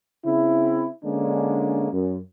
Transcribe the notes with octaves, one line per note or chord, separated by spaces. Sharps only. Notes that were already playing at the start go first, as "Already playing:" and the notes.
C#3 C4 E4
D3 G#3 A#3 C#4 D4
F#2